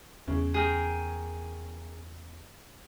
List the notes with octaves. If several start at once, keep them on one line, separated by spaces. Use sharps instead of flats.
E2 C#3
G#4 A#4 G5